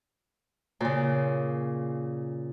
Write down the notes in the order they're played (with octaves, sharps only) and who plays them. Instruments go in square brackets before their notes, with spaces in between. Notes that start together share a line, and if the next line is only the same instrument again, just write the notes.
[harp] A#2 C#3